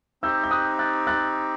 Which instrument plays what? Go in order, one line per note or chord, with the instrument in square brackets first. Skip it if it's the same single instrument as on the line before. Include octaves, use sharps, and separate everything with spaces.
[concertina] C4 D#4 G4 [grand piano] E6 G6
[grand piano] G6
D#6 F#6
F#6 A6
F#6 A6